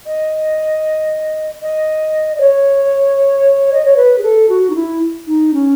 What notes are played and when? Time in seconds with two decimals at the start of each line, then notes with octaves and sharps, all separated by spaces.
0.06 D#5
1.62 D#5
2.36 D#5
2.40 C#5
3.73 D#5
3.85 C#5
3.96 B4
4.18 G#4
4.23 A4
4.49 F#4
4.70 D#4
4.75 E4
5.27 D#4
5.53 C#4